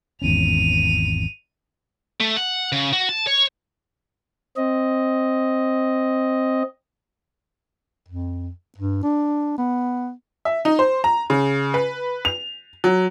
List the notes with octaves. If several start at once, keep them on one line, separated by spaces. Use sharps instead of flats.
G#1 E2 C#4 D#7 F7
A3
F#5
C#3
F#4
A5
C#5
C4 D#5
F2
G2
D4
B3
E5
D#4
C5
A#5
C#3
B4
F7
F#3